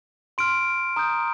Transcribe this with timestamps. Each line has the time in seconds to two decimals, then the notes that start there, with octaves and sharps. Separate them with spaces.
0.38 C6 F6 D7
0.96 A#5 D#6 G6